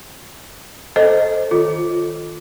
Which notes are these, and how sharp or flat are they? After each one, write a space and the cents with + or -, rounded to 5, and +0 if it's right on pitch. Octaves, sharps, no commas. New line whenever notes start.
A4 +0 C5 +0 D#5 +0
D#3 +0 F4 +0 A4 +0